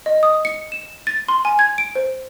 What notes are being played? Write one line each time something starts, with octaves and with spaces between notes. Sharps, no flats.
D#5
D#6
C#7
E7
A6
C6
G#5
G#6
D7
C5